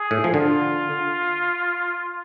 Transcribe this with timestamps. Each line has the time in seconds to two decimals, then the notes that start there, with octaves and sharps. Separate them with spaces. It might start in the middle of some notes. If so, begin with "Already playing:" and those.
Already playing: G#4
0.11 A2
0.24 F3
0.34 D3 F4